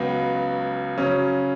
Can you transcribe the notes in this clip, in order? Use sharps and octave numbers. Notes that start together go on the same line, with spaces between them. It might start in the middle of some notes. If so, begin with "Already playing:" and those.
Already playing: C#2 C#3 F#3 B3 F#4
C#3 F#3 C#4